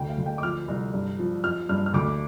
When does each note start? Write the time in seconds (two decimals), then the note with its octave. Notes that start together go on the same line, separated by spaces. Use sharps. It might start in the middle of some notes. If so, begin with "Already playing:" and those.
Already playing: D2 G5
0.09 F5
0.18 D2
0.26 G5
0.38 D6
0.43 F3 F6
0.68 C2
0.94 G2
1.19 F3
1.44 F3 F6
1.69 G2 F6
1.86 F6
1.94 D2 D6